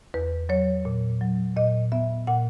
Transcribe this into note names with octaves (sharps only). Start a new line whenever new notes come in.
E2 B4
F#3 C#5
A#2
F#3
A#2 D#5
B3 E5
A#2 F#5